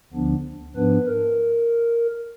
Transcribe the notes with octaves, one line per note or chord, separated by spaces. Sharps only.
D2 D3 F3 B3 D4
G#2 F3 B3 D4 B4
A#4